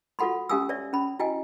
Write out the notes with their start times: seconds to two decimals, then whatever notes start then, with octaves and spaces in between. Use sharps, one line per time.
0.19 F4 F#4 A4 F#5 B5 C6
0.49 C#4 G4 F5 G#5 D#6 E6
0.69 C#5 D5 E5
0.93 C#4 B5
1.19 E4 F#4 D#5 G5 G#5